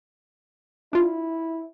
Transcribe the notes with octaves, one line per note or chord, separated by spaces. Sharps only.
D4 E4 F4